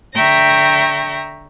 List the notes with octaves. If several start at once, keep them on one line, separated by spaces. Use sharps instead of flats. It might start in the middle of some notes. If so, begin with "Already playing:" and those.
D3 E5 G5 A#5 C#6 A#6